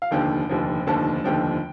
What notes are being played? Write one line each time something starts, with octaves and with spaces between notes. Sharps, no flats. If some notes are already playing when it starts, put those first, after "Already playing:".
F5
F1 D#2 D3 F3 G5
F1 D#2 D3 F3
F1 D#2 D3 F3 A5
F1 D#2 D3 F3 G5